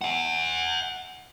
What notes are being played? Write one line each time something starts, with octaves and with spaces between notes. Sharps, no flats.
E5 F#5